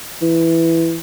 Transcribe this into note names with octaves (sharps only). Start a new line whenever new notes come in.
E3